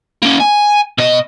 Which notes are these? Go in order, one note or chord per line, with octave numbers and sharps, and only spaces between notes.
A#3 C#4
G#5
B2 D#5